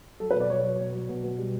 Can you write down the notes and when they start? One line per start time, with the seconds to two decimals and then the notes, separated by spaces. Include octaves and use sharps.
0.20 F#3 A4
0.31 B4
0.35 B2
0.40 D5
0.50 F#3 C#5
0.65 F#3
0.80 B2
0.95 F#3
1.09 B2
1.24 B2
1.38 G3